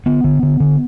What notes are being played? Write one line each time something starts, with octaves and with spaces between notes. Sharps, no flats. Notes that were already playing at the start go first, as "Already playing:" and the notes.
D3 B3
D3
D3
D3